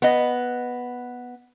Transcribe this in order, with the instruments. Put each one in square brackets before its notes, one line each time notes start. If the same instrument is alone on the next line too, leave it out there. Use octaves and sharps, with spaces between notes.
[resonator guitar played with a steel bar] B3 D#5